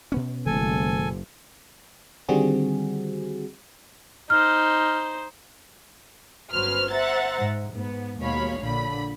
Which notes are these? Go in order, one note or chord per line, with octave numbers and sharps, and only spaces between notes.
B2 B3 C#4
F#1 D#3 G#3 A3 A4 G#5
D3 D#3 G3 C4 F#4 G#4
D#4 C5 F6
G1 F#3 C#4 B4 C5 F6
C5 E5 F#5 A#5 A6
G#2
G#2 B3
D#2 B2 G#3 C#5 F5 B5
A#1 A#2 D3 B5